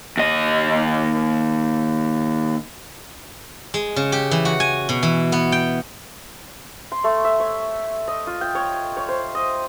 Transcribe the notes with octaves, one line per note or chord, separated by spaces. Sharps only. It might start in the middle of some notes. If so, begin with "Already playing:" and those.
D#2 D#5
G#3
C#3
G4
E3
F#4
G#5
B2
E3
B3
G5
C6
A3
E5
C#5
D#5
F4
G5
C#5
C#5
C5
D#5